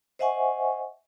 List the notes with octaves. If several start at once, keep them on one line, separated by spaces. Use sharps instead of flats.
C5 D#5 E5 F#5 G#5 C#6